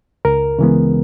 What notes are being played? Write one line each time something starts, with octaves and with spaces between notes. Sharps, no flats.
C#2 A#4
C#3 E3 G#3 B3